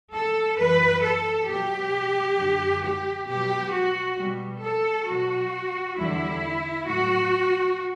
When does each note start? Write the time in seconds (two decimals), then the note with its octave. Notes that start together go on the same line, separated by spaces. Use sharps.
0.14 A4
0.58 F#2 E3 G3 B4
1.04 A4
1.48 B2 F#3 G4
2.38 F#2 D3 F#3
2.83 G4
3.28 B2 F#3 G4
3.73 F#4
4.18 B2 G3
4.63 A4
5.08 B2 F#3 F#4
5.98 E2 D3 G3 E4
6.87 A2 F#3 F#4